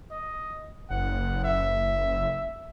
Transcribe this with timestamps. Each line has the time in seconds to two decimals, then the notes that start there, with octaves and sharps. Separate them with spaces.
0.11 D#5
0.90 F#1 F#5
1.44 E5